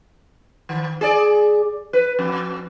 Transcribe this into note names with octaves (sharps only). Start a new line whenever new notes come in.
D#3
G#4 D5
B4
F2